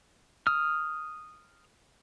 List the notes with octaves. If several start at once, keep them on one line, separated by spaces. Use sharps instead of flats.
D#6 F6